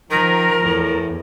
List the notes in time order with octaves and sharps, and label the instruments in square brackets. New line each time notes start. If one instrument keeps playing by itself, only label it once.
[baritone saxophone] D#3 [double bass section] F3 [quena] A#4
[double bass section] E2 [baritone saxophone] A2